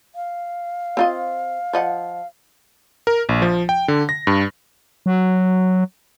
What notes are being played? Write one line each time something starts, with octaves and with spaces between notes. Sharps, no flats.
F5
C4 F4 D#5
F3 D#5 F#5
A#4
A#1
F3
G5
D3
A#6
G2
F#3